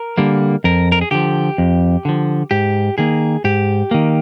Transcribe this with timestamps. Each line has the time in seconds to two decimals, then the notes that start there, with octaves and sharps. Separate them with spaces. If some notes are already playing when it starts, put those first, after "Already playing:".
Already playing: A#4
0.18 D3 G3 A#3
0.64 F2 A#4
0.92 A#4
1.01 G#4
1.11 D3 F3 G4
1.58 F2
2.05 D3 F3
2.51 G#2 G4
2.98 D#3 A#3 G#4
3.44 G#2 G4
3.91 D#3 A#3